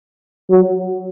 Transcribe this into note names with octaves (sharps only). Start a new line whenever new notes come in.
F#3